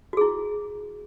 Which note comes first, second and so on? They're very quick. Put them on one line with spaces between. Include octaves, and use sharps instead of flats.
F#4 G#4 E4